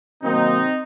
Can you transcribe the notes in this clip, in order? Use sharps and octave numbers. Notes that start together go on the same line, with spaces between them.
C3 D#3 F#3 A#3 C4 D#4